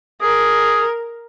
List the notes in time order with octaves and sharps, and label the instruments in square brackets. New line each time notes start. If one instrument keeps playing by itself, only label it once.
[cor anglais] G#4 [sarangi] A#4